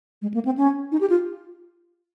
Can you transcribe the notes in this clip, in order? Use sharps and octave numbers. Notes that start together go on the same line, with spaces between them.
G#3
A#3
C4
C#4
D#4
G4
F4